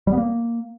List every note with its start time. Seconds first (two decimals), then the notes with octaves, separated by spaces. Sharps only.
0.07 G3
0.12 B3
0.17 A#3